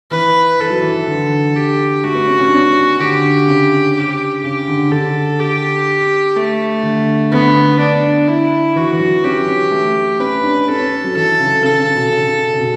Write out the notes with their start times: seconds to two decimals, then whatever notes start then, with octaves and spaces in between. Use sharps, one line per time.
0.11 E3 B4
0.60 E3 A4
0.70 F#3
0.81 E3
1.08 D3
1.56 G4
2.04 A3 F#4
2.15 B3
2.27 C#4
2.39 C#4
2.48 D4
2.55 C#4
2.99 D3 G4
3.47 C#3
3.95 G4
4.43 C#3 G4
4.68 D3
4.91 D3 A4
5.40 G4
6.36 A3
6.83 D3
7.31 D3 B3
7.79 D4
8.27 E4
8.76 E3 F#4
8.93 E3
8.99 F#3
9.24 C#4 G4
9.72 A3
10.19 C#4 B4
10.43 D4
10.68 C#4 A4
10.80 C#4
11.04 F#3
11.16 E3 A4
11.39 C#3
11.64 C#3 A4
11.80 C#3
11.95 B2
12.12 C#3
12.53 C#3
12.60 B2